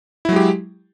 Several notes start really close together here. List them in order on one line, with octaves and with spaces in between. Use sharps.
E4 F#3 G#3 G4